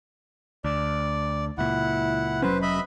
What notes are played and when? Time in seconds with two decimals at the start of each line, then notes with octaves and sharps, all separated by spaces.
0.64 D2 D5
1.58 C#2 A#2 E4 F#5
2.42 F1 F#3 C#4 B4 C5
2.62 D#5 E5 B5